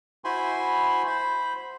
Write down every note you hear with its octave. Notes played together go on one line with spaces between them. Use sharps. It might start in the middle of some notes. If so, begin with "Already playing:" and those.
E4 F#4 C5 G#5 B5 C6
C5 B5